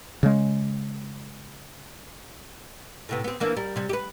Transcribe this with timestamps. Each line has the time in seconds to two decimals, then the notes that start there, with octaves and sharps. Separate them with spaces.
0.23 C#3 G#3
3.09 A2 C3 B3
3.24 B3 C4
3.40 E3 A#3 D4
3.57 G3 A#4
3.76 C3 G3
3.89 G4 B4